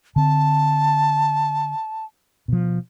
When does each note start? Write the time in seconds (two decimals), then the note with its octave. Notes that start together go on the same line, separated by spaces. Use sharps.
0.16 D3 C4 A5
2.48 B2 F3